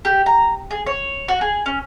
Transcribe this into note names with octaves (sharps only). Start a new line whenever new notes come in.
G4
A#5
G#4
C#5
F#4
G#4
C#4